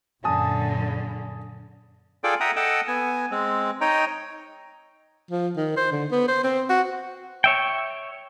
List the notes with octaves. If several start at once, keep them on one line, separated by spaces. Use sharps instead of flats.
F#2 A#2 D3 G#5 A5 D#6
F4 G#4 A4 D5 G5
E5 F#5 G5 A#5 D#6
A4 D#5 F#5 G5 A5
B3 G#5
G#3 C4
D#4 C#5 D#5 G5 A#5
F3
D#3
C5
D3
B3
C5
C4
F#4
C#5 E5 G5